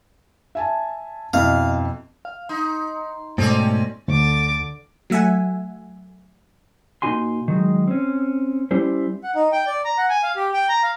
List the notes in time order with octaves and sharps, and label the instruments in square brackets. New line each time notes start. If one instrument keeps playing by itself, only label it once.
[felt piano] E5 G#5 A5
[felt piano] F2 B2 E4 [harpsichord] F5
[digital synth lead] F5
[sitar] D#4 [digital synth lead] C6
[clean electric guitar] G#2 B2 [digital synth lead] A3 [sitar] C4 C#4 D5
[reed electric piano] D2 [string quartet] D3 D6 A6
[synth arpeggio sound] F#3 A3 E5 F#5 G#5
[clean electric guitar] A#2 D4 D#4 F#4 G#5 C6
D#3 F#3 G#3
C4 C#4
G3 C#4 E4 G4 C5
[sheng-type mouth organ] F#5
D#4
G5
D5
A#5
F#5
G#5
F5
G4
G5
A#5
F5